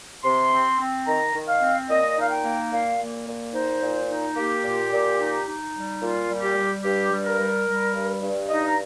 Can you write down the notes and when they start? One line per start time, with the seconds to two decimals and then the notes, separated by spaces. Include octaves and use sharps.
0.23 C3 C6
0.51 C4
0.79 C4
1.06 D#3 A#5
1.34 D#3
1.48 F5
1.61 C4
1.89 A#2 D#5
2.16 D#4 F5
2.30 G5
2.43 A#3
2.71 A#2 F5
2.99 A#3
3.26 A#2
3.53 D#4 C5
3.82 A#2
4.08 D#4
4.36 A#3 G4
4.63 A#2
4.91 A#2
5.18 D#4
5.46 D#4
5.74 G3
6.01 A#2 F4
6.29 G3
6.42 G4
6.56 G3
6.83 G2 G4
7.10 G3
7.25 A#4
7.39 G3
7.66 G3
7.93 G2
8.21 G2
8.48 D#4 D#5
8.66 A#5